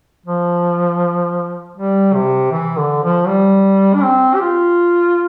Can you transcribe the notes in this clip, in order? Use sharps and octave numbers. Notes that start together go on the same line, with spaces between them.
F3
G3
C3
E3
D3
F3
G3
D4
C4
G4
F4